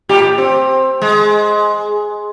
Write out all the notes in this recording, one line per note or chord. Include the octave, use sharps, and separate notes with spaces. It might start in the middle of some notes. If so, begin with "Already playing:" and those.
A2 G4
C4
G#3